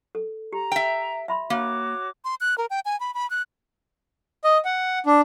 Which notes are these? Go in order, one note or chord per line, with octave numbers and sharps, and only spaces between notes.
A4
G4 A#5
E5 G5
E5 B5 C6
A#3 F#4 C#5 D6
C6
F#6
A#4
G5
G#5
B5
B5
F#6
D#5
F#5
D4